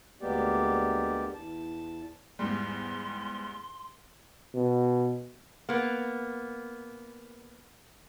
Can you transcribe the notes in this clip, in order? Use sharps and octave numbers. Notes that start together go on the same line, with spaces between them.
D2 G#3 A#3 B3 G4 D5
E2 A5
E2 G#2 G3 C6
B2
A#3 B3